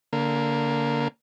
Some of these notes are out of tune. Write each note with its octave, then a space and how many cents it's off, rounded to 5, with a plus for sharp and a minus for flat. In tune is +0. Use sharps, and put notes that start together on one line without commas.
D3 -20 A#3 +0